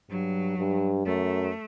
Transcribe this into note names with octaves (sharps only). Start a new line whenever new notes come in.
G2 F#3
G2
F#2 A3